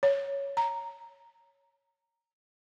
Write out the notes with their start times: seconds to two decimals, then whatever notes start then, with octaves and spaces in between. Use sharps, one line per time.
0.03 C#5
0.57 A#5